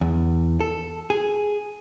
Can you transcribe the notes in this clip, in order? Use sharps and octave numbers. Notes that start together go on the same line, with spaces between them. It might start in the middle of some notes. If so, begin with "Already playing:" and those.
E2
A4
G#4